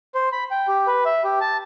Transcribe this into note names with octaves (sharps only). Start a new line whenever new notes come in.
C5
B5
G5
G4
B4
E5
G4
A5